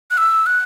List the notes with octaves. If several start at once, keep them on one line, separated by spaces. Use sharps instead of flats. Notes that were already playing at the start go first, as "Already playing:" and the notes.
F#6
E6
F#6